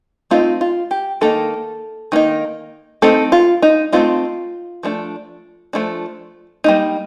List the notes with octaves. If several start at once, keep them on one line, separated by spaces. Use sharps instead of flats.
A3 C4 D#4 F4
F4
G4
D#3 A#3 D#4 A4
D#3 A#3 D#4
A3 C4 D#4 A4
F4
D#4
A3 C4 D#4 F4
F3 A3 D4
F3 A3 D4
G3 A#3 D#4